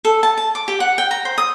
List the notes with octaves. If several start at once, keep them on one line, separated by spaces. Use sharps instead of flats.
A4
A5
A5
D6
G4
F#5
G5
A#5
C5
D#6